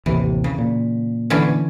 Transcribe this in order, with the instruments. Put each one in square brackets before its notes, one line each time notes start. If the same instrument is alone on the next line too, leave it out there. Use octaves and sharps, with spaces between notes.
[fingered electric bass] A1 D#2 C3 [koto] E3
[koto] C#3
[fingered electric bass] A#2
[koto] D3 E3 C#4